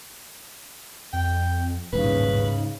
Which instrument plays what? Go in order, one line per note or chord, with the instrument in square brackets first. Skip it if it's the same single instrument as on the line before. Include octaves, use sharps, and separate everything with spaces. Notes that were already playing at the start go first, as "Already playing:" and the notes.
[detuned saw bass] F2 [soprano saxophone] G5
[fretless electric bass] D#1 A1 [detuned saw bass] G#2 [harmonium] C#3 [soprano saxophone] B4